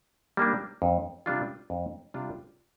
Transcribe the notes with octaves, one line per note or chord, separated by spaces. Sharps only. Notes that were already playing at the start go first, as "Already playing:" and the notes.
G3 A#3 D4
F2
C3 G3 D4 F4
F2
C3 G3 D4 F4